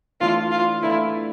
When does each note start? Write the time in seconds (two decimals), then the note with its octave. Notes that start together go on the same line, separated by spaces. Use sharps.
0.21 E3 A3 D4 F4 A4
0.51 F4
0.82 E3 A3 D4 E4 A4